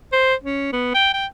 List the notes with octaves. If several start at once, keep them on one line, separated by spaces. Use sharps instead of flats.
C5
C#4
B3
G5
G5